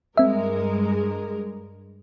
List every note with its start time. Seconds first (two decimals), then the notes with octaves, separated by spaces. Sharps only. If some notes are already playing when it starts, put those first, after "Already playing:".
0.17 G2 G#3 C4 A#4 E5